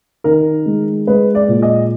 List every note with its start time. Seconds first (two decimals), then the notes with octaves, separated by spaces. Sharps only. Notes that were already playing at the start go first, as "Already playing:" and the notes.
0.24 D#3 A#4
0.66 G#3
1.07 G#3 B4
1.35 D5
1.48 A#2
1.62 D#5